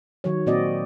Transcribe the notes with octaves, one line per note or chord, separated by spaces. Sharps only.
D#3 F#3 C#5
A#2 A#3 C4 F#4 D5 D#5